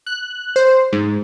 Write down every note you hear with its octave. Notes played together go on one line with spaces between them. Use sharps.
F#6
C5
G#2